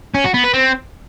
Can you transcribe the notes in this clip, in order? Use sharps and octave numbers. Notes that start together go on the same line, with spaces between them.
C#4
F#4
B3
B4
C4